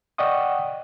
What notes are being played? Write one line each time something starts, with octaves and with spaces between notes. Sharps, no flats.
D5 D#5 F#5 G5 C#6 D#6